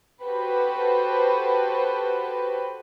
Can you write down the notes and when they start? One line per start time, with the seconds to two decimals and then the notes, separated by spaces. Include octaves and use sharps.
0.23 F#4 G4 A4 B4 C5